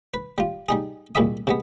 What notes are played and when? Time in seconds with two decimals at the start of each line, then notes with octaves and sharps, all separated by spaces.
0.14 B4
0.38 G3 F4
0.69 G3 D#4 G#4
1.15 C2 A#2 G3 G#3 E5 D#6
1.47 C3 G#3 B3